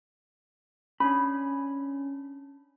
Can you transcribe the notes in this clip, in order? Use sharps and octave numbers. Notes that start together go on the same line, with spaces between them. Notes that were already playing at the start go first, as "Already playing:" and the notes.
C#4 D4 B5